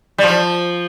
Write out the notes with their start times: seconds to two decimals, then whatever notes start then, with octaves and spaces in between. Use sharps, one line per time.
0.18 G3
0.23 F3